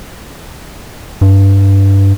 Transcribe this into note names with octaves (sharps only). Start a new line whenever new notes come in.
G2